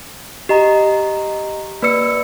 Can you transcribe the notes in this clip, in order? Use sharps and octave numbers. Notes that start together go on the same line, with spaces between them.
G4 D#5 A#5
A#3 B4 D5 E6 C#7